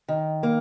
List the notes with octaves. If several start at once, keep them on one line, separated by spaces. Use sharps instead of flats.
D#3
A#3